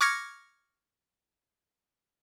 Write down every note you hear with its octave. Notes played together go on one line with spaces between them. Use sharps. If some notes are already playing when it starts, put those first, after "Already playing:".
C#6 D6 F6 G#6 A#6 C#7